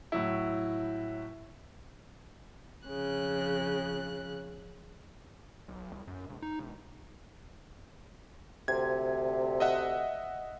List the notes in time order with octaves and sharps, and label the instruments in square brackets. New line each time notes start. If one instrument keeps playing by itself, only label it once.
[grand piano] A2 F#3 E4
[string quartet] F2 C#3 F#6
[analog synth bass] B1
C2
F#2
E1
D#4
E1
[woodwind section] D2 C3 [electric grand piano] G#6
[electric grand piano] D#5 E5 F#5